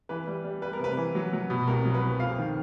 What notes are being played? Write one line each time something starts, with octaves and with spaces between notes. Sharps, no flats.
E3 B4
G3
G3
G3 B4
A#4
C3 B4
E3
F#3
F#3
B2
C2 A#4
F#3
B4
C2
F2 F5
D#3